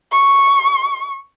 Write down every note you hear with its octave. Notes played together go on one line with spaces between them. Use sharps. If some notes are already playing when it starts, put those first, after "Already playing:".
C#6